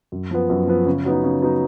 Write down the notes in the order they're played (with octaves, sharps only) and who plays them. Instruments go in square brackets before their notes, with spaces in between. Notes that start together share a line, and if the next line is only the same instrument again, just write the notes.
[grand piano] F#2
F3 B3
F#2
F3 B3
C#3
F#3 B3 D#4
C#3
F#3 B3 D#4